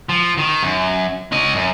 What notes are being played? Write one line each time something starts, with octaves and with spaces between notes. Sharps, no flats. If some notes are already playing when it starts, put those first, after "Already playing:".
F3
D#3
F#2
C#4 D#5
F#2